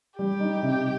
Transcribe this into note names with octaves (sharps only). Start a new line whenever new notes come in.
G3 G4
D#4
C3